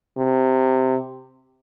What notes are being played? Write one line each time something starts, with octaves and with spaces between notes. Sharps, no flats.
C3